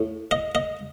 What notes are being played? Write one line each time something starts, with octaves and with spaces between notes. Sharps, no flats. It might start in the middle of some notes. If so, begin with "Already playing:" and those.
Already playing: A2
D#5
D#5